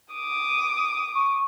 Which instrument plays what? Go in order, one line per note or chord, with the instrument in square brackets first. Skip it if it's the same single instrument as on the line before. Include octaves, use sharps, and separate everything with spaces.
[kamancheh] D6 D#6
[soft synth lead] C#6